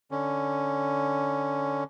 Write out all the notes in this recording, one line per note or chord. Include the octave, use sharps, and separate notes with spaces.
D3 C#4